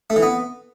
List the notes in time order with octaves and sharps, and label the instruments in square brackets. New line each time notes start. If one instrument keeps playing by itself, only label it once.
[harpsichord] A3
E3
B3